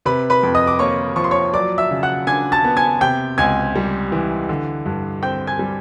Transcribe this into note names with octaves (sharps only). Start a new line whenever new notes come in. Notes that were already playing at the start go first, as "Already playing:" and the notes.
C3 B4 B5
B4 B5
F2
D#5 D#6
D6
A#3 C#5 C#6
F3 C#6
C6
C#5 C#6
F#3 D5 D6
E5 E6
C#3
F#5 F#6
D4 G#5 G#6
A5 A6
B3
G#5 G#6
C3 G5 G6
C#2 G#5 G#6
G3
E3
D3
G2
C4 G5 G6
G#5 G#6
G3